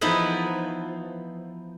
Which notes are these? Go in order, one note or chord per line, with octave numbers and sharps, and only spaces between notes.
E3 F3 B3 D#4 E4 B4